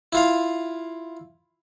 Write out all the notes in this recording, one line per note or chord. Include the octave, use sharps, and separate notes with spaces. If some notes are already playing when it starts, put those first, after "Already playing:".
E4 F4 F5